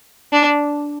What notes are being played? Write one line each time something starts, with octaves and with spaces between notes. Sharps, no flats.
D4